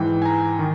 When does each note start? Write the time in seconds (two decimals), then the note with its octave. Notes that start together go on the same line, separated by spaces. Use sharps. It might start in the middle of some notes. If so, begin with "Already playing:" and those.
Already playing: G#2 E3 G5
0.22 G#5
0.25 A#5
0.59 D#3